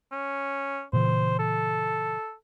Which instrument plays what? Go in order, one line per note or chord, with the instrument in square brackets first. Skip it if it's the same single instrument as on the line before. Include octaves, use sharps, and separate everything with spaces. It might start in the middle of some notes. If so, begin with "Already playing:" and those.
[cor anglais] C#4
[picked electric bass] A#2 C#3 E3 [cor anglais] C5
[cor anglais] A4